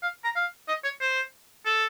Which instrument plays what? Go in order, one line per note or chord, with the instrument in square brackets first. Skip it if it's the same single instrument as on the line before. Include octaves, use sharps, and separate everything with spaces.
[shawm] F5
A#5
F5
D#5
C#5
C5
A4